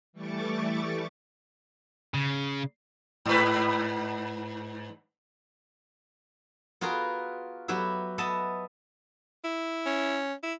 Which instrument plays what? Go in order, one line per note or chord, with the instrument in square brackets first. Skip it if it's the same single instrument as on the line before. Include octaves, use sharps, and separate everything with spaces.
[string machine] E3 G3 A3 C#6 D6 A6
[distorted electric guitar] C#3
[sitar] G#2 B4
[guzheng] B3 F4 F#4 G#4 A#4
F#3 B3 F#4 G4 E5
B3 D#5 E5 A5
[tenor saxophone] E4
[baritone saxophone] C#4
[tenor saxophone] E4